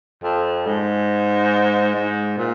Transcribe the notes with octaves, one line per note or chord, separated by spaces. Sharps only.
F2
G#2
G#2
A#2